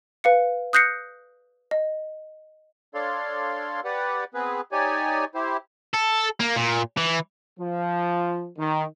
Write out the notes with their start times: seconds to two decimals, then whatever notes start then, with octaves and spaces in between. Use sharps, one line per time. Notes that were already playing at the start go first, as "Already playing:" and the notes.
0.24 B4 F5 C#7
0.73 D#6 F#6 G6 A#6 C7 C#7
1.71 D#5
2.94 D4 A4 C#5 D5 F5 C6
3.85 G4 B4 D5 F#5
4.34 B3 C4 G#4 B4
4.72 D#4 G4 C#5 D5 G#5
5.35 E4 G4 C5
5.94 A4
6.40 A#3
6.56 A#2
6.98 E3
7.60 F3
8.58 D#3